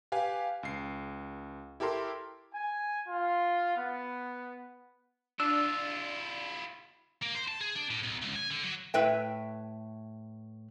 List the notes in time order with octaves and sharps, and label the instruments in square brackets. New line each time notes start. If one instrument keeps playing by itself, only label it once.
[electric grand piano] G4 B4 F5 G#5
C#2 C7
E4 G4 A4 A#4 C6
[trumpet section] G#5
F4
B3
[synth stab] D4 [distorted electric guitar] E4 F4 [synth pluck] E6
[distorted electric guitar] A#3
C5
A5
G#4
D4
A2
B1
C#2
G#5
D3
F#3
[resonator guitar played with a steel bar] A2 B4 E5 G5